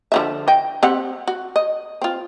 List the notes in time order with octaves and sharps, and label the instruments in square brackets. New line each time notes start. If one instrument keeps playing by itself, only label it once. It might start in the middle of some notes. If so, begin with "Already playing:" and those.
[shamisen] D3 F3 E5
D#5 G5
C4 G4 F#5
F#4
D#5
C4 F4